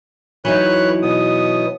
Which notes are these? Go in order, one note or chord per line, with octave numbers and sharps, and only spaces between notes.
E3 F#3 D#4 B4 C#5 F#6
B2 B3 D#6